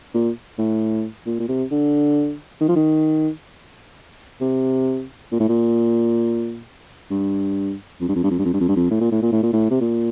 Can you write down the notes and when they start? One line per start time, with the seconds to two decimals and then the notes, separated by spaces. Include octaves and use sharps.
0.14 A#2
0.58 A2
1.26 A#2
1.40 A#2
1.48 C3
1.71 D3
2.61 D#3
2.68 F3
2.76 D#3
4.41 C3
5.31 A#2
5.40 A2
5.49 A#2
7.11 G2
8.01 F2
8.09 G2
8.15 F2
8.23 G2
8.31 F2
8.39 G2
8.45 F2
8.54 G2
8.61 F2
8.68 G2
8.76 F2
8.91 A2
9.01 A#2
9.12 A2
9.22 A#2
9.32 A2
9.43 A#2
9.53 A2
9.71 C3
9.81 A#2